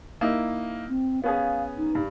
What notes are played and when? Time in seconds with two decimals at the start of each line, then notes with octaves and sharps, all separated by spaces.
0.21 A#3 D#4 E4
0.89 C4
1.24 B3 C#4 G#4 F5
1.78 D#4
1.95 G2